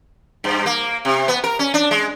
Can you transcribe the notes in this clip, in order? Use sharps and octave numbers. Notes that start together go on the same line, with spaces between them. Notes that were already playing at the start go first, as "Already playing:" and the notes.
G2
A#3
C3
B3
A#4
C#4
D4
G#3